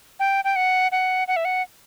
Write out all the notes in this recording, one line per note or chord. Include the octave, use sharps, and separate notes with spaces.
G5
G5
F#5
F#5
F#5
E5
F#5